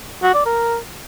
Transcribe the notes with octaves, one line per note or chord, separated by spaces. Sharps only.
F#4
D5
A#4